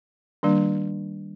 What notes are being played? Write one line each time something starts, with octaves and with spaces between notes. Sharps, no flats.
D#3 G3 A#3 D4